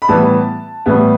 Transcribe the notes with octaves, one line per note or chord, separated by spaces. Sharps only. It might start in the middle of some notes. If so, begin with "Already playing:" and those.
B5
A2 E3 G3 B3 A5
A2 E3 G3 B3